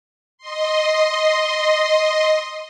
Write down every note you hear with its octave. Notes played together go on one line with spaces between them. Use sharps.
D#5 C6